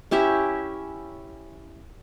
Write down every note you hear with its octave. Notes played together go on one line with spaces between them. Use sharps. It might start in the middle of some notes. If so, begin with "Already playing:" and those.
C#4 E4 G4 E5